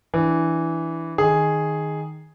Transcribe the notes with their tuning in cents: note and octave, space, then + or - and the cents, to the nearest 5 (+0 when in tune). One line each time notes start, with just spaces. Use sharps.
E3 +0 D4 -5
D#3 +0 G#4 +0